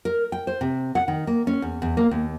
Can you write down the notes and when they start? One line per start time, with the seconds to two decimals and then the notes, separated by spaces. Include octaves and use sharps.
0.05 A#4
0.32 G5
0.47 C5
0.61 C3
0.95 F#5
1.08 D#3
1.27 A#3
1.47 C#4
1.62 E2
1.82 E2
1.97 A#3
2.11 D#2